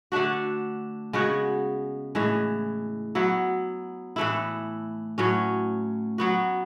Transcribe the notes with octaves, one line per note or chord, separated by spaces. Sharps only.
D3 A3 D4 F#4
C#3 G#3 B3 F#4
A2 E3 G#3
F#3 B3 E4
A2 E3 A3 E4
A2 F#3 C#4
F#3 B3 F#4